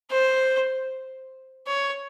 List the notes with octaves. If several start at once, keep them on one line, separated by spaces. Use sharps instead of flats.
C5
C#5